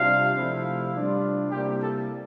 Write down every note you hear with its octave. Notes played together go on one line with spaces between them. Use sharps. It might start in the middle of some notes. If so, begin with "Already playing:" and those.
Already playing: C3 G3 D4 F4 F5
C3 F3 A3 E4
C3 G3 D4 F4
C3 G3 A#3 E4 G4 G5
A4 A5